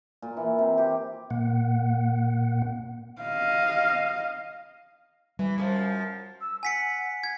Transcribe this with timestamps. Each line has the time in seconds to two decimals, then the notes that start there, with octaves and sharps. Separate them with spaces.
0.22 A#2
0.37 E3
0.59 C3
0.78 G4
1.30 A#2 A#3 F#5
3.22 D#5 F5
5.39 E3 G3
5.58 F#2 C#3 F3
6.40 E6
6.63 F#5 G#5 B6 C#7
7.24 G#6